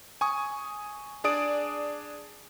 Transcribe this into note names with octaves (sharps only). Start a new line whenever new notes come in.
G#5 C#6 D#6
D4 G#4 D5 D#6 D7